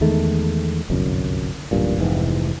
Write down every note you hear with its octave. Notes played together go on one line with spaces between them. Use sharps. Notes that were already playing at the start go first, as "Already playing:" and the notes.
E2 D#3 G#3 A3
G1 C2 F#2
D1 A1 G2 A#2
F1 G#2 E3